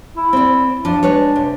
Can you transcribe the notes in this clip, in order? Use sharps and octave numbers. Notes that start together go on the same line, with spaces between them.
E4
C4 D5
F3 D4
G#3 B4 C#5
C3